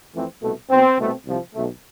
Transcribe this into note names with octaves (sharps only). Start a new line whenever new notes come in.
F2 E3 A3 C4
C2 B2 A3
B1 B2 B3 C4
C2 B2 A3 C4
C2 C3 F3
B1 B2 A3